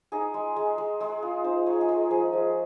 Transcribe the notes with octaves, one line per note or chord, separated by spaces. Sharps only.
D#4 G#4
G#3
G#3
G#3
G#3
F4
D#4 C5
G#3 C#5
G#4
G#3 A#4
F3 G#4
F3